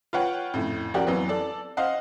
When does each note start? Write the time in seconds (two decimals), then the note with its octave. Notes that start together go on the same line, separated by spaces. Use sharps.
0.13 F4 B4 C#5 F#5 G5
0.54 F2 A2 C#3
0.94 F3 C#4 F#4 G4 A#4 D5
1.07 F2 E3 F#3 B3
1.29 A4 D5 A5
1.77 C5 D#5 F5 F#5